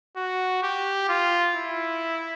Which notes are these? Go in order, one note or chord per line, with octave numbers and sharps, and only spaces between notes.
F#4
G4
F4
E4